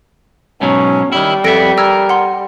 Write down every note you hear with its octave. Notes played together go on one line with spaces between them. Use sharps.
G#2 B2 F#3 C#4
D#3 G3 E4
F2 B3 A4 E5 A#6 D7
A#4 E6 G#6
F#5 C6 C#7